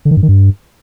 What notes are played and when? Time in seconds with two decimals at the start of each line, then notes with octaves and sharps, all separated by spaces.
0.05 D3
0.11 D#3
0.17 G2
0.23 D#3
0.28 G2